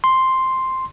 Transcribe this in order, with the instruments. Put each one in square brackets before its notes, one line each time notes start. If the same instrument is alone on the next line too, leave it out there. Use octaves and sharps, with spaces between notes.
[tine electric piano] C6